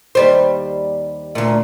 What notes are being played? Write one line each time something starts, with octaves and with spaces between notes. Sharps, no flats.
D#2 G3 C5
D2 A#2